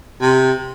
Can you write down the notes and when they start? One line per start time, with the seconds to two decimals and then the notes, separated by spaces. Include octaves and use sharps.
0.21 C3